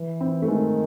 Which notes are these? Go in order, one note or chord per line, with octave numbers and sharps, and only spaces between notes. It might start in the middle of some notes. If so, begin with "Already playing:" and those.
Already playing: E3
C4
A3
D#3 G#3